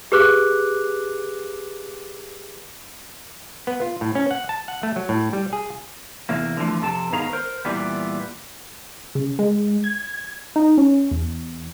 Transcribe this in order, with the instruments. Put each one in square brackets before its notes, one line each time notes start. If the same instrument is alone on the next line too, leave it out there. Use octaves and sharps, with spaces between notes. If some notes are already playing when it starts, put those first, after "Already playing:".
[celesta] G4 G#4 B4 D6 F#6
[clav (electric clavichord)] B3
F4
A2
C#4
F#5
A5
F#5
A3
F#3
A2
G3
G#4
[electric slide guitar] E2 C3 A#3
D3 E3 F3 A3
F2 C3 A4 A5
G#2 D#3 B3 G#4 F5 A#5
A#4 C5
A#2 E3 G3 B3
[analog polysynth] C#3
G#3
G#6
D#4
C#4
E2